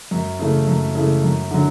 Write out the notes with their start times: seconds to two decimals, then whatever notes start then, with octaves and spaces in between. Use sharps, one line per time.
0.11 F#2
0.39 C#3 E3 A3
0.67 F#2
0.95 C#3 E3 A3
1.24 F#2
1.51 D3 F#3